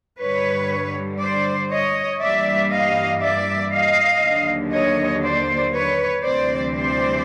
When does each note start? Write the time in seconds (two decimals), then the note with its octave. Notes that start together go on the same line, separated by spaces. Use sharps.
0.20 G2 D3 G3 B4 C#5
1.20 C5 D5
1.71 C#5 D#5
2.21 G2 E3 G3 A#3 D5 E5
2.71 D#5 F5
3.22 D5 E5
3.72 D#5 F5
4.22 D#2 D3 F#3 A#3
4.72 C#5 D#5
5.23 C5 D5
5.73 B4 C#5
6.24 D2 C3 E3 G3 C4 C5 D5
6.74 C5 D5